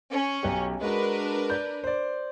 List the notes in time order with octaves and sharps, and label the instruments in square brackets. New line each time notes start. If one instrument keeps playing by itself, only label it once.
[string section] C#4
[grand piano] B1 G4
[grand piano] G#3 F#4 [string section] D4 A#4 B4
[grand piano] D5 G6
C5 D5